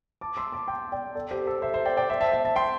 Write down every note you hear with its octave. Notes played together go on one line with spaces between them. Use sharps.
A5 D6
C6 E6
A5 D6
G5 C6
D5 G5
A4 D5
G4 C5
A4
C5 E5
C5 E5
D5 G5
D5 G5
C5 E5
E5 A5
E5 A5
E5 A5
G5 C6